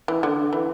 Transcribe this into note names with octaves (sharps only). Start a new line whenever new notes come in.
E3
D3
E3